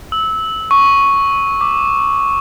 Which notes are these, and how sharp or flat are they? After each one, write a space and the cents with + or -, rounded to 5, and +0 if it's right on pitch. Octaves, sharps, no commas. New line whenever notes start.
E6 -20
C#6 +0
D6 +5